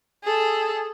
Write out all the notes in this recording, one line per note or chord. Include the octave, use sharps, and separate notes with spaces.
G#4 A4